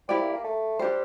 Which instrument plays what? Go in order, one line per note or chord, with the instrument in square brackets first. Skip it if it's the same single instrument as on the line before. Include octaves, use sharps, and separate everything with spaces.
[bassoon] C4 [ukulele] E4 G4 D5
[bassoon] A#3
A#3
A3
[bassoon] G3 [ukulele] D4 G4 C5